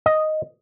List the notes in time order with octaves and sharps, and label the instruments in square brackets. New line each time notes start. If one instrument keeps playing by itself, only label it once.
[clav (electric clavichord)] D#5